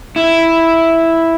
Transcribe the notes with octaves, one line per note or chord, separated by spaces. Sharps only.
E4